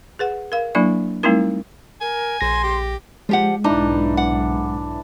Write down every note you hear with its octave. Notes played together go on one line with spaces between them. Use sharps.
G#4 B4 F#5
A#4 F5
F#3 A#3 D4 E4 D5 B5
G3 A3 C4 D#4 E4 A#4
A#4 G#5
A#1 C6 A#6
G4
F3 G#3 G4 F#5
B1 G#2 E3 D4 D#4
F#5